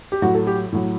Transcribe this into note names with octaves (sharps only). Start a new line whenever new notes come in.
G4
A2 F#3 F#4
A4
G4
A2 F#3